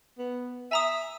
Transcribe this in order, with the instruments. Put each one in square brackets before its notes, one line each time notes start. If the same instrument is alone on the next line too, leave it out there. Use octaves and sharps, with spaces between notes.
[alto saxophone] B3
[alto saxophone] E5 [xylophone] G#5 A#5 D#6